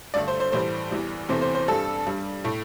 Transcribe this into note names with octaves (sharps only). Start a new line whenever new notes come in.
G2 D3 A3 D5
C5
C5
A2 E3 G3 C5
E2 E3 G3
E2 C3 E3 A3 C5
C5
C5
G2 G3 A4
G2 G3
A2 A3